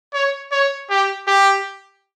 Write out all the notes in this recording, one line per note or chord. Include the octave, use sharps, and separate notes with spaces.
C#5
C#5
G4
G4